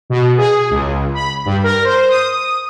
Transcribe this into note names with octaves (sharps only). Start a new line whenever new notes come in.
B2
G#4
C#2
B5
G2
A#4
C5
D#6